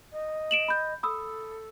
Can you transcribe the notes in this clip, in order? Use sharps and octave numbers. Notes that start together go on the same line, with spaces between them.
D#5
D7 E7 F#7
B5 G6
A4 B5 D#6 E6